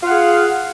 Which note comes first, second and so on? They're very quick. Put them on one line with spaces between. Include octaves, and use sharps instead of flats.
F4 F5 F#5 G#4